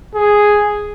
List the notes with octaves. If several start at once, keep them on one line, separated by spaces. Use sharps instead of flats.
G#4